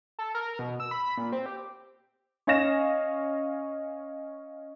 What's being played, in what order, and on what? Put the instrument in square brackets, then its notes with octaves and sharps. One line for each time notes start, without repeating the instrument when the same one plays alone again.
[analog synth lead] A4
A#4
B2
E6
B5
A#2
C4
G4
[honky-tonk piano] C#4 C#5 D#5 F5 A#6 E7